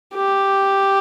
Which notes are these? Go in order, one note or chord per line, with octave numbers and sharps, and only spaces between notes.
G4